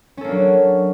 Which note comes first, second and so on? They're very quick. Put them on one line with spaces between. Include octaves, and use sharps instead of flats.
C#4 A4 A#3 D4 F#3